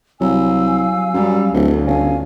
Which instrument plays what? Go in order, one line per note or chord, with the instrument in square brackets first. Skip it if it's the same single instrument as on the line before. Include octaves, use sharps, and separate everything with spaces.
[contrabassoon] C2 [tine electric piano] F#3 [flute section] F5 G#5 E6
[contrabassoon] F#2 [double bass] G3
[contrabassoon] D1 [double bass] D2
[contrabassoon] G1 [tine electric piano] C#4 [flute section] C#5 F5 G#5